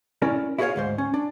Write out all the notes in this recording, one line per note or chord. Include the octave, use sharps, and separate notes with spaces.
C#4 E4 A#4 D5
E4 F#4 G#4 B4 C#5 F5
D2 G#2 C5
C#4
D4